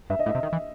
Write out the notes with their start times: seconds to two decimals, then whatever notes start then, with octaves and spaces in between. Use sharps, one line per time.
0.10 G2 E5
0.19 D#5
0.26 A2
0.29 E5
0.35 C3
0.43 D#3
0.53 E3